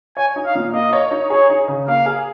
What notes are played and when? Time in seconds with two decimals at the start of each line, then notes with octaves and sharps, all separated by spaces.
0.17 C#5 G#5
0.36 D#4
0.46 F5
0.55 A#2
0.73 A#3 D#5
0.93 C#5
1.11 D#4
1.30 G#4 C#5
1.50 D#4
1.68 C#3
1.88 A#3 F5
2.06 G#4